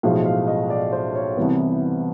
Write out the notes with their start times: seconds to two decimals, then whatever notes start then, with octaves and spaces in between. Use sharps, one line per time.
0.03 B1 A2 F3 G#3 F5
0.26 F5
0.48 D#5
0.70 D5
0.92 C5
1.15 C#5
1.37 C2 C3 E3 G3 B3